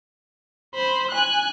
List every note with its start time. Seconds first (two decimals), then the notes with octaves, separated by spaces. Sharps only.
0.75 C5 B5
1.11 G#5 F#6